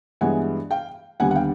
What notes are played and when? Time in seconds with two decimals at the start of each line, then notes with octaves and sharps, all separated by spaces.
0.21 G2 E3 G#3 B3 F#5 G#5
0.71 F5 G5
1.20 D#2 D3 G3 B3 F#5 G#5
1.31 F#5
1.35 F5 G5